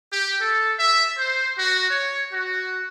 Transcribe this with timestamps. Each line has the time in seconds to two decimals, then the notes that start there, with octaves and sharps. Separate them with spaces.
0.12 G4
0.41 A4
0.79 E5
1.18 C5
1.59 F#4
1.91 C#5
2.33 F#4